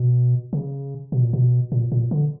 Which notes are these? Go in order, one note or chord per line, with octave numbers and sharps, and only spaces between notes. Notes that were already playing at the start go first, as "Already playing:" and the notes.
Already playing: B2
C#3
B2
A#2
B2
A#2
A#2
D3